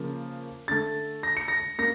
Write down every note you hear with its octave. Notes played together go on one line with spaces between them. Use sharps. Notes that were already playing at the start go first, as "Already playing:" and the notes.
Already playing: C#3 F3 A#3
D3 A3 A6
A#6
C#7
A#6
A#3 A#6